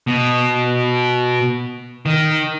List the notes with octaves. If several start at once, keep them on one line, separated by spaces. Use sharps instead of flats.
B2
D#3